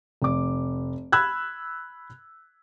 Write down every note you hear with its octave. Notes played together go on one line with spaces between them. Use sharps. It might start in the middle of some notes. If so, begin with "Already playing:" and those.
F1 D6
B5 E6 F#6 G#6